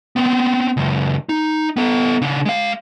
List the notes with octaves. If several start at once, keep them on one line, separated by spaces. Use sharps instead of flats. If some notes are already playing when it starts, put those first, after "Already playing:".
B3 C4
C#2 F#2
D#4
B3 A4
C#3 D4
G#3 F5